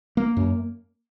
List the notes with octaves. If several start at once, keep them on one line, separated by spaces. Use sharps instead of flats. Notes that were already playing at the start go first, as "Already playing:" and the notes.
A#3
F#2